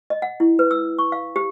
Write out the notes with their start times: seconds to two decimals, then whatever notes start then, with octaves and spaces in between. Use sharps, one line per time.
0.10 D#5
0.22 F#5
0.40 E4
0.59 B4
0.71 E6
0.99 C#6
1.12 F5
1.36 G4